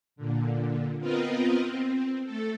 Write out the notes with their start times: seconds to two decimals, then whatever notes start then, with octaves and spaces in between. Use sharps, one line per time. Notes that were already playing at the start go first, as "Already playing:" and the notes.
0.16 A#2 D3
0.99 B3 C4 F4 A#4 B4 D#5
1.60 C4
2.24 A3 A4